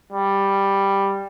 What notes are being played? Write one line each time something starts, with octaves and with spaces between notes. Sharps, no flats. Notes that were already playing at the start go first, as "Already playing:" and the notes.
G3